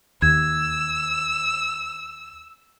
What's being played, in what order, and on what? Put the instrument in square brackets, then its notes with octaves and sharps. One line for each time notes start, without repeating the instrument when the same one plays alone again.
[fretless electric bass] D#2 [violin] E6 [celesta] G#6